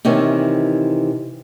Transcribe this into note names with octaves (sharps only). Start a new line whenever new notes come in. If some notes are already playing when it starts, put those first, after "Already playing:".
C3 D#3 E3 C#4